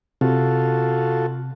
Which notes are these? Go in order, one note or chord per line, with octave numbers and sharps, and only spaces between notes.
C3 F4 F#4 A4